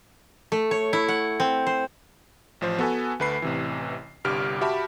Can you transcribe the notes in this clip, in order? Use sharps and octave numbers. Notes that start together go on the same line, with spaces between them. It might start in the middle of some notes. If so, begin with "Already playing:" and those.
A3
C#5
E4
F#5
C4
C5
A1 F3 C5
B3 F#4 A4 B4 G#5
D2 A3 B4 B5 C7
A1 C3 E3
G1 C2 G2 G4 F6 D7
F#4 G4 E5 A5 B5